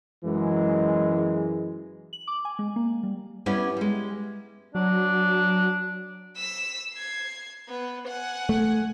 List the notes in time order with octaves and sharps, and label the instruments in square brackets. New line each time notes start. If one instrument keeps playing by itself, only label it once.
[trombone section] F#2 E3 G#3
[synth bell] F#7
D6
G#5
G#3
A#3
G3
[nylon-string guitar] G3 B3 C#4 E4 D5
G3 G#3
[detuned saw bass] F#3 [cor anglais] D4
[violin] E6 B6
G#6 C7
B3
F#5 G#5
[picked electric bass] A3